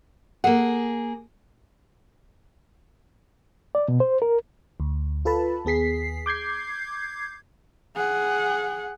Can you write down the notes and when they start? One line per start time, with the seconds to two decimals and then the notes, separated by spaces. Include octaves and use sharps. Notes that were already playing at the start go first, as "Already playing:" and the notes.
0.44 A#3 G#4 A4 F#5
3.75 D5
3.88 B2
4.00 C5
4.22 A#4
4.80 D2
5.25 F4 A4 B4 A5 B5
5.65 D#2 B3 G#4 B6 C7
6.26 D6 G6 G#6 C7
7.96 G#4 F#5